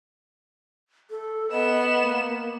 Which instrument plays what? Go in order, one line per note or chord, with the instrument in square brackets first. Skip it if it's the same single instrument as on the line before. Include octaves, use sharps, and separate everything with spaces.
[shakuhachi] A4
[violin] B3 E7 [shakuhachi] D#5
[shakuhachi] A#3